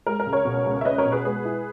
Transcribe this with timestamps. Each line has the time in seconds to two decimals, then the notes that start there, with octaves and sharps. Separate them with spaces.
0.06 G#3 A#4
0.20 A#4
0.26 C#2
0.33 A#4 C#5
0.45 B2
0.66 C#2
0.81 E5
0.85 C#4 B4 D#5
0.98 A#4 C#5
1.05 B2
1.12 G#4 B4
1.25 G#3 G#4 B4
1.45 E4